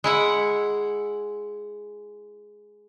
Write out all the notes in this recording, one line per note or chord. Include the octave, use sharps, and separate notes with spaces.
G#3 E4 F#5